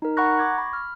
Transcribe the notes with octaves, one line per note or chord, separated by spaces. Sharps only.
D#4 A#4
F#5 A#5 B5 C#6 F#6 A#6
C#6 D6 G#6 A#6
B5
F6